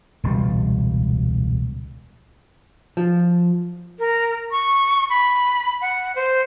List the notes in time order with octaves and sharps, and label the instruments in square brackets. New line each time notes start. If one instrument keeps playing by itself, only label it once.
[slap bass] E1 C#2 A#2 G3
[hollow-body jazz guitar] F3
[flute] A#4
C#6
B5
F#5
C5